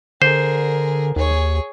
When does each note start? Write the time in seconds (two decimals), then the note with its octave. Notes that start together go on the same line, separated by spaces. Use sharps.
0.22 D3 G#4 A#4 C5
1.16 D#2 G#4 C#5